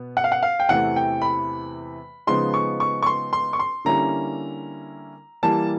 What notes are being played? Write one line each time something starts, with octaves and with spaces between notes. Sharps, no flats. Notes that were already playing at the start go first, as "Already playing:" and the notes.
Already playing: B2 B3
F#5
F5
F#5
F5
G5
E2 C3 E3 A3 F#5
G5
B5
C#3 F3 G#3 B3 D#4 C6
C#6
C#6
C#6
C6
C6
C#6
C6
D3 G3 A#3 C#4 E4 A#5
E3 G3 A#3 A5